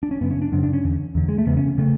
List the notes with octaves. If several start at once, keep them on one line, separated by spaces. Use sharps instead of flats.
D4
C#4
F#2 C#3 B3
C#4
D4
F#2 C#3 D4
D4
C#4
E2 D3
E2 D3
G#3
A3
E2 C#3 B3
C#4
C#3 A3